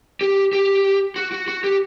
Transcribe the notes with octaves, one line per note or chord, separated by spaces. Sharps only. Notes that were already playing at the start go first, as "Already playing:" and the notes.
G4
G4
F#4
F#4
F#4
G4